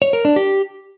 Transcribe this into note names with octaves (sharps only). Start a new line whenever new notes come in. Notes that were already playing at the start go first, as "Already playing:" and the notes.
C#5
A#4
D4
G4